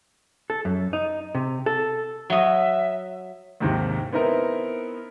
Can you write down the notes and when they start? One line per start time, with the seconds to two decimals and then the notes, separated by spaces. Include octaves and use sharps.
0.50 A4
0.65 F#2
0.93 D#4
1.35 C3
1.66 A4
2.30 F#3 D#5 E5
3.60 D#2 G#2 C3 D#3
4.12 B3 C4 D#4 E4 A#4